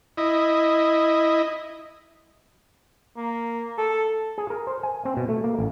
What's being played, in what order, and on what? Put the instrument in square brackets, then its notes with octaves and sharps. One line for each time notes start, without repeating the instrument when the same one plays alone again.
[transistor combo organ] E4 D#5
[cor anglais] A#3
A4
[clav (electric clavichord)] G#4
A#4
C5
G#5
C4
B2
A3
A#3
A1